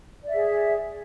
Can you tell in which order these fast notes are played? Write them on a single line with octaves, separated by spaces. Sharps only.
D5 E5 G#4